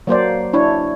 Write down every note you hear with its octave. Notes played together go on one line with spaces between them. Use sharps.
F#3 A#3 C5 D5
D4 E4 C#5